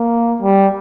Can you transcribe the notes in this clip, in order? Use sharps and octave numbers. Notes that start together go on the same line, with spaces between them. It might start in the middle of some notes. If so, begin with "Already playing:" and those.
Already playing: A#3
G3